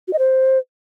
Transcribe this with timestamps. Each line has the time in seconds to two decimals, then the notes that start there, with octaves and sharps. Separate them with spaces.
0.08 F#4
0.13 D#5
0.19 C5